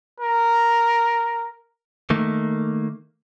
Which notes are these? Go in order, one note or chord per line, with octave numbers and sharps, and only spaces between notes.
A#4
D#3 A3 A#3